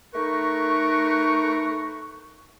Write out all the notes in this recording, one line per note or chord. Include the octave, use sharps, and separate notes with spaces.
A3 D#4 A#4 B4 C#6